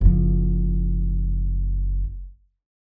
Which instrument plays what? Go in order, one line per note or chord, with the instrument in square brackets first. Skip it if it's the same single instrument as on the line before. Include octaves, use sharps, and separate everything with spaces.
[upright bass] F#1 F3